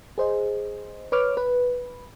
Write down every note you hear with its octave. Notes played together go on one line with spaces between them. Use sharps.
G#4 C5 D#5
B4 C#5 D6 F6
B4